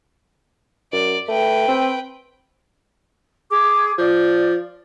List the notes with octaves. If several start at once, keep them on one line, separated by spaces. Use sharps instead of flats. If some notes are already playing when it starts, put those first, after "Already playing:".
F#2 D5
A3 B4 G5
C4
G#4 D6
F3 D5